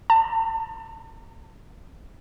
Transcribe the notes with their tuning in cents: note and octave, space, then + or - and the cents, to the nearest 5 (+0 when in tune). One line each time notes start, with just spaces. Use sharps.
A5 +35